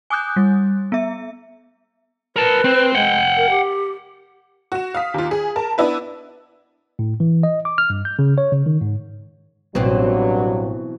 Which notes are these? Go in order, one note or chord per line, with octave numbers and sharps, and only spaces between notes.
G#5 D6 D#6 F#6 G6
G3
B3 E5
A#4 B4 A5
C4 C5
G#3 F#5 G5
A#4
G4
F#4 E7
F5 D#6 B6
D#2 F4
G#4
A#4 A5
B3 D4 E4 B4
A2
E3
D#5
D6
F6
G2
G6
C#3
C#5
C#3
D#3
G#2
A1 G2 B2 E3 F#3 C4